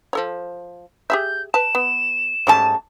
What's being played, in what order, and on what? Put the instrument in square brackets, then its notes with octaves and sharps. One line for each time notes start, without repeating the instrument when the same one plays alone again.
[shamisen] F3 A4 C#5
[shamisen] G4 G#4 E5 [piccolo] G6
[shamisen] B4 A5 [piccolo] E7
[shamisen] B3
[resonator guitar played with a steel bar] G#2 A5 [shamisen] G3 A3 C#4